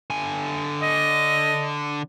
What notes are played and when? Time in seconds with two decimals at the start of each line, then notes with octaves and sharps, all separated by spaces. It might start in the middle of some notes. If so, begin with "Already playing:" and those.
0.10 D3 G#5
0.82 D#5